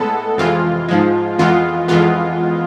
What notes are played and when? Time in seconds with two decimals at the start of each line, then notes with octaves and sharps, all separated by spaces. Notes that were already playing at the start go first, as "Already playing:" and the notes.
Already playing: A2 G#3 B3 A4
0.38 F2 C3 E3 G#3 F4
0.89 G#2 F3 G#3
1.38 F2 E3 G#3 B3 F4
1.88 F2 E3 G#3 B3 F4